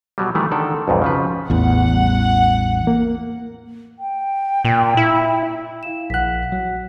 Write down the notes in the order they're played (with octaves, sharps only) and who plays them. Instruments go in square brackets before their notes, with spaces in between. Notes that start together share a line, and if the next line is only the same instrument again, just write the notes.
[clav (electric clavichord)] B2 F#3 G3
D#3 E3 G3 A3
D3 D#3 A4 D5
B1 F2 G#2
C#3 F3 B4
[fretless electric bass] A1 E2 [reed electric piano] E3 [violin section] F#5
[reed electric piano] G3
A#3
[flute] G5
[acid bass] A#2
E4
[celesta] E4 F5 E7
[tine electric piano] A#1 F#6 [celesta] F#5 B6
[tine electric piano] F#3